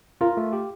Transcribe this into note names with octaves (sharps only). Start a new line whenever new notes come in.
F4 A#4
A3
G4